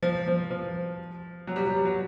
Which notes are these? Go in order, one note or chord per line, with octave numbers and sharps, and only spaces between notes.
F3
F3
F3
F#3
G3
F#3
G3
F#3